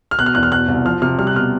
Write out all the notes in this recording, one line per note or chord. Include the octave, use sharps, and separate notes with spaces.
F6
B2 F#6
F6
E2 F#6
F6
B2 F#6
C2
F3 F6
C3 F6
G3 F6
F#6
B2 F6